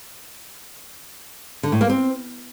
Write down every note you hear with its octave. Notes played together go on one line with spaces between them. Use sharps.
D3
A2
A#3
C4